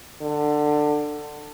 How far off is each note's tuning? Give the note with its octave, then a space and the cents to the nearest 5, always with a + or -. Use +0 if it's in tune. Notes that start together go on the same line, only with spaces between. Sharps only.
D3 +20